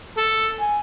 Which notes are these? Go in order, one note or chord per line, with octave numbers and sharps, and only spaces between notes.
A4
G#5